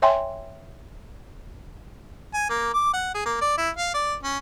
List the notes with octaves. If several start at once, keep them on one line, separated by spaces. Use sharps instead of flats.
C#5 E5 G5 G#5 C6
G#5
A#3
D6
F#5
G#4
A#3
D5
E4
F5
D5
C#4